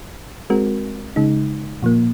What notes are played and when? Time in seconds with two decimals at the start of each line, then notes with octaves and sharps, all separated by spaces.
0.50 G#3 C4 F#4 A#4
1.16 C#3 G#3 D#4
1.83 A#2 F3 A#3